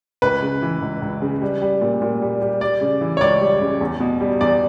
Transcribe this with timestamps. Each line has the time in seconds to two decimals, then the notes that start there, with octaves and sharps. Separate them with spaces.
0.22 C#2 B4
0.42 C#3
0.62 E3
0.82 C#2
1.02 C#2
1.22 C#3
1.42 G3
1.62 G3
1.81 A#2
2.02 A#2
2.22 G3
2.41 G3
2.61 G3 D5
2.81 C#3
3.01 E3
3.17 C#5
3.21 C#2 D5
3.41 G3
3.61 C#3
3.81 E2
4.00 B2
4.20 G3
4.41 E2 D5